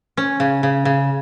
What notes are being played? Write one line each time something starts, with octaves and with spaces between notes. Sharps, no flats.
C#4
C#3
C#3
C#3